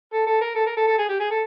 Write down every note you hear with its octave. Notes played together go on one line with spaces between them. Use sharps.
A4
A4
A#4
A4
A#4
A4
A4
G#4
G4
G#4
A4